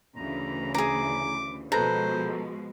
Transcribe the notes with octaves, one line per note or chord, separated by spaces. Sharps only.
D2 C#3 E3 A#5
G#4 A#5 D6
B2 F3 G#3 A4 B4 C5 A#5 A#6